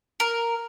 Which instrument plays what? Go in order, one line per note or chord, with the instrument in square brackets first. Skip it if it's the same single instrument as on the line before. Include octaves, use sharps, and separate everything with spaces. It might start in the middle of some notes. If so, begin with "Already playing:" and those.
[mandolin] A#4